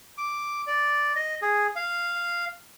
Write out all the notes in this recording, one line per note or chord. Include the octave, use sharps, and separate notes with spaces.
D6
D5
D#5
G#4
F5